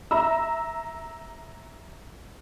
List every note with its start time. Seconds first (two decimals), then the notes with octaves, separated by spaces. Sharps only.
0.11 E5 A#5 E6